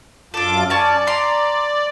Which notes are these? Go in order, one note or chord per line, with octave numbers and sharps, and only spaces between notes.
F#2 D4 F4 A4 D6
C#4 D5 A5
A#5 C6